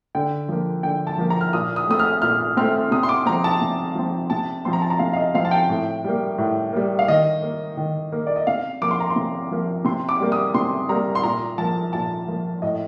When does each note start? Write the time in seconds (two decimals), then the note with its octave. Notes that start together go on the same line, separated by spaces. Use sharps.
0.15 D3 G5
0.48 F3 A#3
0.83 D3 G5
1.07 A5
1.18 F3 A#3
1.30 A#5
1.41 F6
1.53 A#2 D#6
1.76 D#6
1.88 A3 C4 D#6
1.99 F6
2.22 A#2 F6
2.57 A3 C4 F6
2.91 C3 D#6
3.03 C6
3.09 D6
3.26 F3 C4 A#5
3.44 A5
3.61 C3
3.95 F3 C4
4.30 C3 A5
4.65 F3 C4 C6
4.73 A#5
4.82 A5
4.90 A#5
4.99 C3 F5
5.13 F5
5.16 D#5
5.34 F3 C4 F5
5.45 A5
5.51 G5
5.69 A2
6.04 G3 A#3
6.38 A2
6.73 G3 A#3
6.99 F5
7.08 D#3 D#5
7.42 A#3
7.77 D#3
8.12 A#3
8.27 D5
8.36 D#5
8.47 C3 F5
8.81 F3 A#3 D6
8.91 C6
9.00 A#5
9.10 C6
9.16 C3
9.51 F3 A#3
9.85 C3 C6
10.09 D6
10.20 G3 A#3
10.32 D#6
10.54 C3 C6
10.89 G3 A#3 A#5
11.15 C6
11.23 A#2 A#5
11.58 F3 A#3 A5
11.93 A#2 A5
12.28 F3 A#3
12.62 A2 D#5